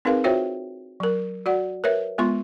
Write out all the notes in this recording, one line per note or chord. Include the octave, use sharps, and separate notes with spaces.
C4 D#4 G#4 A#4 B4 F5
F4 F#4 C5 C#5 E5 G5
F#3 A#4
F#4 D5 F#5
A#4 B4 C#5 E5
G#3 B3 F4 C6 C#6